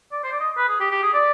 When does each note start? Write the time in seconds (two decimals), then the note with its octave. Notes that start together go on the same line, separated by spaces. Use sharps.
0.12 D5
0.24 C5
0.32 D5
0.40 D#5
0.57 B4
0.68 G#4
0.80 G4
0.91 G4
1.02 G#4
1.13 D5